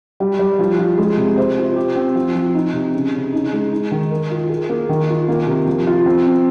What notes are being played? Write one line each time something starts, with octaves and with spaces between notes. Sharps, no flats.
G3
G3
F3
F4
G#3
C3
C5
F4
G4
C4
F3
F3
D#4
C3
C#3
C#3
D#4
G#3
D#4
D#3
A#4
F4
G#4
A#3
D#3
F4
A#3
C3
F3
F4
C4
C4